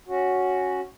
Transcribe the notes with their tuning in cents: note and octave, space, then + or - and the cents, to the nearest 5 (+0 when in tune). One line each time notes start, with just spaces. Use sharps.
C#4 +0 F#4 +0